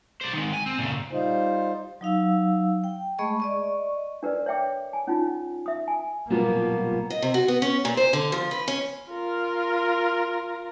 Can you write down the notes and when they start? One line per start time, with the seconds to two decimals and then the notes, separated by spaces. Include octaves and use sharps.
0.21 C5 D5
0.34 D#3 G#3
0.54 G#5
0.66 C4
0.78 A#2 C#3
1.12 G3 D#4 F4 C5
2.01 F#3 D#4 F5 E6
2.84 G5
3.19 G#3 A3 G#4 D#5 B5 C#6
3.40 D5 D#5 C#6
4.23 D4 A#4 B4 D5
4.46 C#5 E5 G5 D6
4.93 G#5
5.07 C#4 D#4 F4
5.66 E5 D#6
5.88 G#5
6.30 B1 A#2 F3 G3 A#3 B3
7.10 D#5
7.22 C3
7.34 F#4
7.48 B3
7.62 C#4
7.85 A#2
7.97 C5
8.13 D3
8.32 F3
8.51 B4
8.68 C#4
9.09 F4 A#4